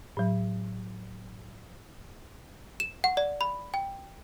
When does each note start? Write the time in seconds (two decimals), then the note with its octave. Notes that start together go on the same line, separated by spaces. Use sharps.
0.17 A2 F#3
2.80 E7
3.04 F#5
3.17 D5
3.41 B5
3.74 G5